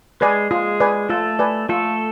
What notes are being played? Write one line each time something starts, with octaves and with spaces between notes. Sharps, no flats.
G#3 G#4 B4 D5 G#5
G#3 F4 G#4
B4 D5 G#5
A3 F4 A4
B4 D5 G#5
A3 F4 A4